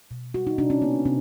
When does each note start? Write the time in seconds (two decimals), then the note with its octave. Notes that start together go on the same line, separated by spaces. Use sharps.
0.11 B2
0.34 G3 F#4
0.47 D#4
0.58 C3 D4
0.70 C#4
0.82 A#3 B3
1.05 C3 C4